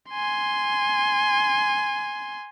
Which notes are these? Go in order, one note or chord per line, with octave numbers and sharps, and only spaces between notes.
G#5 C6